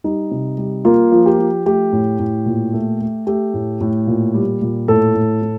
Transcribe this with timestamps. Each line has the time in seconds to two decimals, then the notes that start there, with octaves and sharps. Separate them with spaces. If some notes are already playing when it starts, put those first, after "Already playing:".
0.04 G3 D#4
0.31 C3
0.58 G3
0.85 A#3 F4
1.12 F3
1.26 G4
1.39 F3
1.66 A3 G4
1.92 A2
2.19 A2
2.46 A#2
2.73 A3
3.00 A3
3.27 A3 G4
3.54 A2
3.81 A2
4.07 A#2
4.34 G3
4.61 A#2
4.88 A2 A4
5.15 A2
5.42 A2